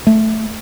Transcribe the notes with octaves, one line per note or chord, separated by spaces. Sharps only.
A3